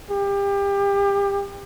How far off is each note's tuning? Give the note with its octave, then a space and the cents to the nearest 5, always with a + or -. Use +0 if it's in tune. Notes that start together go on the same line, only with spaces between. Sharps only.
G4 +30